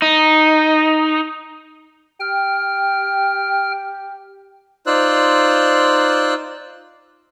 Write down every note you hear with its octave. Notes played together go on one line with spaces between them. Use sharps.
D#4
G4 G5 F6
D#4 F4 C5 D5 E6 F#6